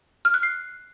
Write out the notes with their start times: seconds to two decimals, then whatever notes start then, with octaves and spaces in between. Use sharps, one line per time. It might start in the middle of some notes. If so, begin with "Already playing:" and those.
0.25 F6
0.34 F#6
0.43 C7